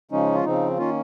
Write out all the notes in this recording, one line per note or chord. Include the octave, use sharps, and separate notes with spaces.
C#3 F3 G#3 C#4 D#4
F4
C#3 F3 C4 D#4
D#3 A#3 C#4 F4